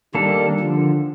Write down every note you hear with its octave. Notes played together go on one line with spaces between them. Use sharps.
D#3 G3 A#3 D4 A4
D3 F3